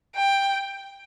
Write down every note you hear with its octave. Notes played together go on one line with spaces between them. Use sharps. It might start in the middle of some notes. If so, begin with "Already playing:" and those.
G5